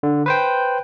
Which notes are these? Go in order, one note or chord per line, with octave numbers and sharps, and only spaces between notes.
D3
B4 C5 G5